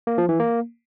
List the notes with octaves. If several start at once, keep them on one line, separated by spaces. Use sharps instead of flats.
A#3
F3
E3
A#3